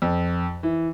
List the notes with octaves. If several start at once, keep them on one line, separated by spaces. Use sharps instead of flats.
F2
E3